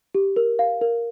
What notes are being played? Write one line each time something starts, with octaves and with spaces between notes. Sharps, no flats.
G4
A#4
F5
A#4